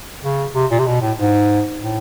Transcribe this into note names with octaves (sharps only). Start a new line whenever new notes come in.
C#3
C3
A#2
C3
B2
A2
G#2
A2